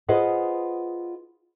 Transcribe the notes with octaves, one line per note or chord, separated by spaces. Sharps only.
F4 G#4 B4 C5 D#5 F#5